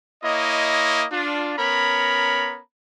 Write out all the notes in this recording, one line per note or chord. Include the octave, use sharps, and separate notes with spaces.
A#3 E4 C#5 D#5
D4 F4
B3 C#4 A#4 C#5 A#5 B5